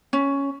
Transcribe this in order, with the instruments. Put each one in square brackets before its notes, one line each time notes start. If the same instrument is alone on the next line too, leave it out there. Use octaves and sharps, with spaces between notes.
[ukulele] C#4